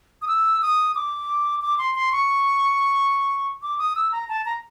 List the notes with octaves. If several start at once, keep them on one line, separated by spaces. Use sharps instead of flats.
D#6
E6
D#6
D6
D6
C6
C6
C#6
D6
D#6
E6
A#5
A5
A#5